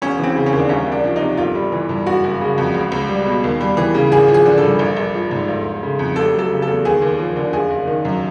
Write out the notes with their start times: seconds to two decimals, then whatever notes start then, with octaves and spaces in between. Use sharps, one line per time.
0.02 E1 C#4
0.19 E3 C4
0.36 C#3
0.46 C#4
0.53 D#2
0.59 D4
0.69 C2 C#4
0.87 C2
0.92 D4
1.04 F3
1.16 C3 D#4
1.37 G1 F4
1.55 G3
1.72 E3
1.89 G2
2.06 F#1 F#4
2.24 F#1
2.41 C#3
2.58 F2
2.74 C#2
2.92 C#2
3.09 G3
3.25 B2
3.44 D#2
3.61 G3
3.77 E3
3.94 C#3
4.12 G#1 G#4
4.28 F3
4.34 G#4
4.45 D3
4.58 A4
4.63 G2
4.79 A#1
4.97 A#1
5.14 F3
5.31 G#2
5.48 G1
5.65 G1
5.83 C#3
5.99 F2
6.16 F1 A4
6.33 F#3
6.39 A4
6.51 C#3
6.62 E2 A4
6.85 D#2 G#4
7.02 D#2
7.18 F3
7.36 D3
7.53 F#1 G#4
7.71 F#1
7.87 D#3
8.05 F#2